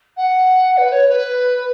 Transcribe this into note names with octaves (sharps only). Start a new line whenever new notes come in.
F#5
B4
C#5
B4